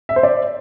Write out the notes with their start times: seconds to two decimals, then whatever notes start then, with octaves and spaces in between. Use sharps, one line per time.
0.09 E5
0.16 C5
0.23 D5